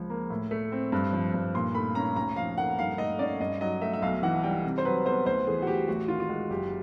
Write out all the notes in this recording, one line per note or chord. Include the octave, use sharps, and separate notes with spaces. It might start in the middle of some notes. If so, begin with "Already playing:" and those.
Already playing: C#2 F3
A#3
A2
A3
C4
G2
F3
G2
A#2 C6
A3 B5
C#4 A#5
D2 A#5
F3 F5
A#3 F#5
G2 F5
A3 D#5
C#4 D5
G2 D#5
F#3 D#5
A3 E5
E5
B1 F5
E3 F#5
G3 G5
C3
C5
F#3 B4
B3 C5
D2 C5
E3 G#4
F#4
D2 G4
A1 F#4
D#3 F4
F4
G#3 F#4
F#1 G4